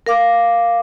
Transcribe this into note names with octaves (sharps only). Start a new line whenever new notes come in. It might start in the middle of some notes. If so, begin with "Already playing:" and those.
A#4 F5 D6